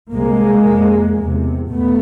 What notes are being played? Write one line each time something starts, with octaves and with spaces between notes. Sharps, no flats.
C2 C3 G#3 A#3
F2 C3
E2 C3
E2 B2 A3 B3